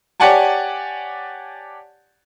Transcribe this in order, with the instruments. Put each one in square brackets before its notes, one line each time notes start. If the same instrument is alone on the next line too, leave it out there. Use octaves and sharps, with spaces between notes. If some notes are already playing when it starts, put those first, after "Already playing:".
[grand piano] G4 C#5 D5 F#5 G#5 A5